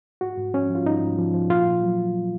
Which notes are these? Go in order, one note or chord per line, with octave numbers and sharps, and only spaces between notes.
G#2 F#4
G#2
F3 C#4
F3
F4
G#2 D#4
G#2
F3
F3
A#2 F4
A#2
F#3